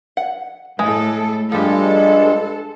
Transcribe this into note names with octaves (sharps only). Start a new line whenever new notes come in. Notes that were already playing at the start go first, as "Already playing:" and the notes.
F#5
A2 G#3 A4
G2 F3 G3 G#3 A4